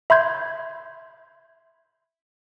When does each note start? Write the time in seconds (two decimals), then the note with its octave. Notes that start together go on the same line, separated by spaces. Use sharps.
0.10 E5 B5 C6 G6 G#6